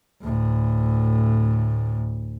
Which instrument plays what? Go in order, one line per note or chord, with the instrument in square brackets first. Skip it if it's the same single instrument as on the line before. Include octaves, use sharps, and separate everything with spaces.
[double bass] D2 A2